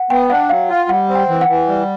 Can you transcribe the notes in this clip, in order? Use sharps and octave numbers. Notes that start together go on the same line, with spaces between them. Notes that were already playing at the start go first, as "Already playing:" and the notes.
Already playing: F#5
B3 G5
D4 F#5
F#3 F5
F4
G3 F#5
C4
G5
E3
F#5
E3
G3